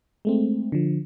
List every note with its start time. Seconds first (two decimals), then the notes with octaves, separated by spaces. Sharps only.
0.25 G#3 A3 C4
0.72 D3 F3